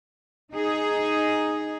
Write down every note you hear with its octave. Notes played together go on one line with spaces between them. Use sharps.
D#4 G#4